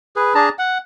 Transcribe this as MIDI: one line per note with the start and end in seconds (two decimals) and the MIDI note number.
0.16 0.34 68
0.16 0.34 71
0.35 0.49 62
0.35 0.49 68
0.35 0.49 81
0.35 0.49 82
0.59 0.78 78